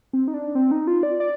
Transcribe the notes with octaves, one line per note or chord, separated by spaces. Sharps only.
C4
D#4
D4
C4
D#4
F4
D5
D5